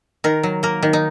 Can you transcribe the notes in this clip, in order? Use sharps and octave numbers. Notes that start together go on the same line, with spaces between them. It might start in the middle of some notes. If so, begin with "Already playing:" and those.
D#3 A#4
F#3
A#3 A#4
D#3
D#4